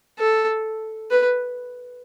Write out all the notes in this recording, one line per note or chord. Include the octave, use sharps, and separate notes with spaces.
A4
B4